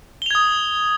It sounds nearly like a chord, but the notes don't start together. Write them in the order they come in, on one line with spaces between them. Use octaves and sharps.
G7 F7 G#6 D#6